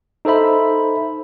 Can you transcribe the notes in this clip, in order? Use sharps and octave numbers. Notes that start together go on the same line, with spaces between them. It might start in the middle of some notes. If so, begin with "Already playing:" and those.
D#4 A4 C5 E5 B5